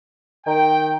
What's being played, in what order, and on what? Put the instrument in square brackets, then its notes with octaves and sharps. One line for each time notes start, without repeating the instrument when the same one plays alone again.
[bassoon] D#3 [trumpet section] G5